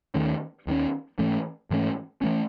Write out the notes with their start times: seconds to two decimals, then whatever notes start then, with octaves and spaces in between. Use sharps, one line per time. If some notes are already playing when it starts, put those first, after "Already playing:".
0.14 D#2 D#3 A3 C#4
0.67 D#2 D#3 A3 C#4
1.19 G#2 E3 A3 C#4
1.70 G#2 E3 A3 C#4
2.22 E3 A3 C#4